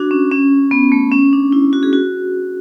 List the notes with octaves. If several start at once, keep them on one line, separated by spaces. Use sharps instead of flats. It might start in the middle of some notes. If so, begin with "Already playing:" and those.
Already playing: D4 F#4
C#4
C#4
B3
A3
C#4
D4
E4
F#4
G#4
F#4